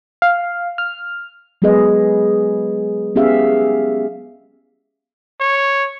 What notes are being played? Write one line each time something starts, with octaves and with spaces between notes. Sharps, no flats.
F5
F6
F#3 G#3 B3 G#4 B4 D#5
B3 C#4 G4 G#4 E5 F5
C#5